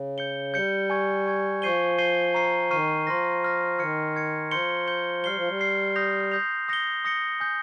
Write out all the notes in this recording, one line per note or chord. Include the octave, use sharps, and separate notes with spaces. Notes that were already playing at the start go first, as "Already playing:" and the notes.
Already playing: C#3
G6 C#7 G7
G3 G6 C#7 G7
G#5 C#6 G#6
G#5 C#6 G#6
F3 C#6 G6 C7 D#7 G7
C#6 G6 C7 D#7 G7
A#5 C#6 F6 C7 D#7
D#3 A#5 C#6 F6 C7 D#7
F3 C6 F6 A#6
C6 F6 A#6
D#3 F6 G#6 C#7
F6 G#6 C#7
F3 C6 G6 C#7 G7
C6 G6 C#7 G7
G3 F6 C7 G7
F3
G3
F6 C7 G7
D#6 G6 A#6 F7
D#6 G6 A#6 F7
D#6 A#6 C#7 G7
D#6 A#6 C#7 G7
G#5 D#6 G6